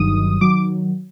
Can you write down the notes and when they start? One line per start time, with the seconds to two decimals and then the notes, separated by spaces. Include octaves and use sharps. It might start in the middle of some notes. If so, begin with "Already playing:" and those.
Already playing: G1 G2 D#3 F#3 D#6
0.41 D#3 F#3 D6